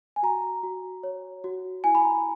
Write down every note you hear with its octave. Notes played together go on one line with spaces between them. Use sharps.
G#5
F#4 A#5
F#4
C#5
F#4
E4 G#5
B5
A#5